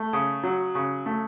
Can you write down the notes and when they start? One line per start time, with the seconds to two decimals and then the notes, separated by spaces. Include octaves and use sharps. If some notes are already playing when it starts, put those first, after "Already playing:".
Already playing: A3
0.13 C#3
0.44 F#3
0.75 C#3
1.06 A3